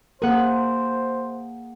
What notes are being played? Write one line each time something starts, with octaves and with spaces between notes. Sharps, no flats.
A#3 G#4 A#4 C5 F#5